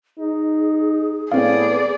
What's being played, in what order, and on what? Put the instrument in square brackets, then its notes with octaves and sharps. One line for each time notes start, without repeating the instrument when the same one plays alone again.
[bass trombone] D#4 [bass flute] G#4
[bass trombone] A2 [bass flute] B3 [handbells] C4 F5 [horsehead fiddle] G#4 D5